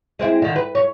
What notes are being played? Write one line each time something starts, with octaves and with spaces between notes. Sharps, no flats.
G#3 C4 E4
D3 D#3
B4
C#5